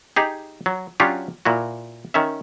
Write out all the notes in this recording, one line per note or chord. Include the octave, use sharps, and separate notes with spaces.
D#4 G4 G#4
F#3
F#3 C#4 D4 F4 G4
A#2 E4 F#4
D#3 C#4 E5